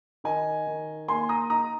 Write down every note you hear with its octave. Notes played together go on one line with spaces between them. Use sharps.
D#3 D#5 G#5
D#3
A#3 G#5 C6
A#5 D#6
D#4 A#5 D#6